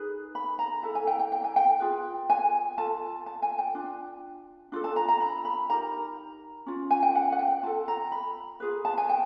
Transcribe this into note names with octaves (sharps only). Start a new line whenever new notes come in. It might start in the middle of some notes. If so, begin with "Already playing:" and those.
Already playing: D#4 G#4 B4
B5
A#5
E4 A4 A5
G#5
G5
G5
G5
G#5
G5
F4 G#4 B4
G#5
F4 A4 A5
A5
G#5
G5
D4 F4
D4 F4 A4
A5
A#5
A#5
B5
B5
D#4 G4 A#4 A#5
C#4 F4
G#5
G5
F#5
F#5
G5
F4 A4 A5
A#5
B5
F4 G#4 B4
A5
G#5
G5